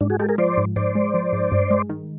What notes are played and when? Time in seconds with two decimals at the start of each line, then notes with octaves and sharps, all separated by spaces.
0.01 G#2 D4
0.10 F#4 G#4
0.19 G#3 G4 A4
0.29 G#4 A#4
0.38 F3 C5 D5
0.57 G#2
0.76 G#2 C5 D5
0.95 G#3
1.14 F3
1.33 G#2
1.52 G2
1.70 G#3
1.89 D#3